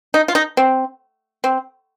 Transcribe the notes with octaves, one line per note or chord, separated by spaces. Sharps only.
D#4
F4
D#4
C4
C4